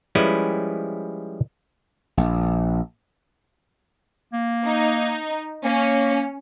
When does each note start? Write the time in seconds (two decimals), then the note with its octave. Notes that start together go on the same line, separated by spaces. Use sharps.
0.15 F3 G3 G#3 C#4 E4 B4
2.17 A#1
4.33 A#3
4.67 D#4
5.65 A#3 C#4